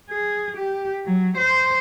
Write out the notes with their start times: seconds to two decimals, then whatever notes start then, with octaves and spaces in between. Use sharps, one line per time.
0.10 G#4
0.57 G4
1.06 F#3
1.37 C5